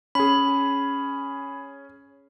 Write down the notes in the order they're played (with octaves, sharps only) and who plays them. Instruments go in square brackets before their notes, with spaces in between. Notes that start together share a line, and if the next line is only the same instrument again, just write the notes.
[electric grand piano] C#4 G#4 [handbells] B5